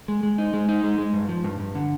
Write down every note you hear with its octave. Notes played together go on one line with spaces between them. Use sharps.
G#3
G#3
D#4
G#3
D#4
G#3
G#3
G2
F3
G2
G2
D3